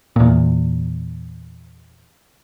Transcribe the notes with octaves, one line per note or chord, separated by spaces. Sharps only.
E2 A#2